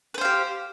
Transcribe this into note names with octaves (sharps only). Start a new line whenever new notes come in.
G4 B4 C5 F5